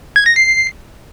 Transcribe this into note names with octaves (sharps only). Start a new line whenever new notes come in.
G#6
A#6
C7